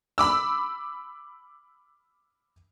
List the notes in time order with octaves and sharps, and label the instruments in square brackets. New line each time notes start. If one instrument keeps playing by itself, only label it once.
[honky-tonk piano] B5 D6 E6